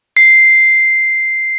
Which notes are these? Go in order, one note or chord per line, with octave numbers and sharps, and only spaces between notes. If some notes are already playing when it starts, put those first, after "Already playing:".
C7